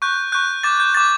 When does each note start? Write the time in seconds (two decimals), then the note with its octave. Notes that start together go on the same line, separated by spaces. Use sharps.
0.02 C#6 F#6 G6
0.32 C#6 F#6 G6
0.64 D6 G6 A6
0.80 G6
0.94 D6 G6 A6